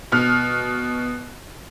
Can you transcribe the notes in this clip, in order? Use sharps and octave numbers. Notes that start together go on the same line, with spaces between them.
B2 F6